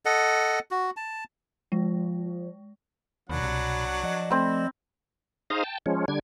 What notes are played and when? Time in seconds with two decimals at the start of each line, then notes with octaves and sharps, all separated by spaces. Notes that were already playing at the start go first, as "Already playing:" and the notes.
0.05 A4 D#5 F#5
0.71 F#4
0.97 A5
1.72 F3 G#3
3.29 D#2 B2 F#3 D4 F#5 B5
3.43 C2
4.03 F3 D5 D#5
4.31 A3 C4 B5
5.50 D#4 G#4 C5 F5 A#5 D#6
5.64 G5 A5
5.86 F3 G#3 C#4
6.08 D3 G3 D4 G#6